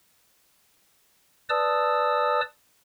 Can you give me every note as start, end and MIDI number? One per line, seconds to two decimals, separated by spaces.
1.49 2.41 71
1.49 2.41 74
1.49 2.41 81
1.49 2.41 87
1.49 2.41 88